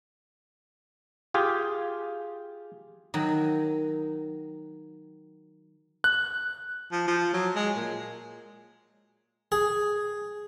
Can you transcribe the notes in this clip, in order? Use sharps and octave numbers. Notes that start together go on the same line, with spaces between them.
F4 G4 G#4
D#3 F#3
F#6
F3
F3
F#3
G#3
A#2
G#4